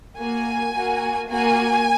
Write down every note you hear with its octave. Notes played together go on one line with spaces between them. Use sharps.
A#3 F#4 G#5
A#3 F#4
A#3 F#4 G#5